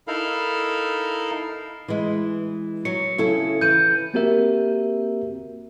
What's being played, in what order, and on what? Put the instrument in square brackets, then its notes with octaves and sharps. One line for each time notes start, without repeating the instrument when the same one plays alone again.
[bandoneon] D#4 E4 A4 A#4 F5
[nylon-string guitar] E3 G#3
[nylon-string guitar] F#3 [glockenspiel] C#7
[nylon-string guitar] C#3 E4 A4
[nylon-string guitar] E3 [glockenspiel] G6 D#7
[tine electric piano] A#3 C4 F#4 G4 A#4 E5